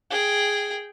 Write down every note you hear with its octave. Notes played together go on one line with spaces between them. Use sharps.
G#4 G5